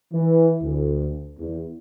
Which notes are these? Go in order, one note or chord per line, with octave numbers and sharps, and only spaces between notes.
E3
D2
E2